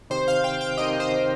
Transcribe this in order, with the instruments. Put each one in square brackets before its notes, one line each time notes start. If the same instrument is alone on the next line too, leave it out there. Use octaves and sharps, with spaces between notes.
[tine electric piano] C3 D#3 C4 D#4 G4 [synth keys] C5
[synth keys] F5
G5
G5
[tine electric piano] C3 D#3 C4 D#4 G4 [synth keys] D#5
[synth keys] C5